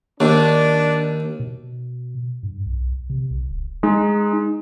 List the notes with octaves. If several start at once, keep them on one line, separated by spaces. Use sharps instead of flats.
D#2 D4
B2
G2
B1
C3
B1
D1
G#3 D#4